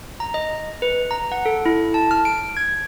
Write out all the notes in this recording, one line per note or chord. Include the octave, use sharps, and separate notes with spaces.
A#5
D#5
B4
A#5
F#5
A4
E4
A5
F6
D7
G#6